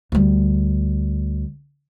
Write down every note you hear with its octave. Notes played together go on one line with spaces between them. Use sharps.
D2 G3